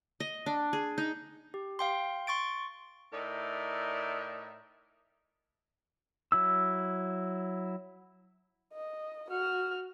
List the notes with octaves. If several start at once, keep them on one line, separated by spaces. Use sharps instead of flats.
D#5
D4
G#4
D#4
G4
F5 G5 C6
C6 C#6 A6 D7
A2 D#4 A#4 D5 E5
F#3 E4 E6
D#5
F#4 F6